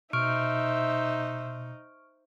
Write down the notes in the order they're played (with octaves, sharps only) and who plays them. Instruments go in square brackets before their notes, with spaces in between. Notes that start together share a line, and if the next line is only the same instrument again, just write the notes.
[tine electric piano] B2 [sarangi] D#4 [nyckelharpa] C5 E5 [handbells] C#6 F6 D7